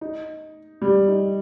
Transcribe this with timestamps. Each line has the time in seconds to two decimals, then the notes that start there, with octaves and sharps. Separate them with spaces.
0.01 D#4
0.82 G3
1.08 D#4